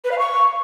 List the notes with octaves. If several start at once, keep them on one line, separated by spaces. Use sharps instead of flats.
B4
F5
C#6